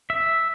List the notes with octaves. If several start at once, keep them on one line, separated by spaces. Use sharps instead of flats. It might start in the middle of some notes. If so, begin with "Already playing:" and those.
E5